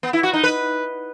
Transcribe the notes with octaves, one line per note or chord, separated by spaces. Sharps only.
B3
E4
F#4
D#4
B4